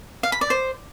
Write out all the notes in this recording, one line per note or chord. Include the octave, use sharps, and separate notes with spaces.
F5
B5
D5
C5